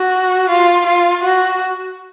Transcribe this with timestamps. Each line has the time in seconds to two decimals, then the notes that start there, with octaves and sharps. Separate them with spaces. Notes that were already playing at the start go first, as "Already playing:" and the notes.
Already playing: F#4
0.49 F4
0.86 F4
1.23 F#4